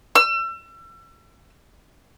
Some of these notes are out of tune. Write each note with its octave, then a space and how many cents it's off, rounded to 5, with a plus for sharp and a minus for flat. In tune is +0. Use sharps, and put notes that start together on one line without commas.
E6 +35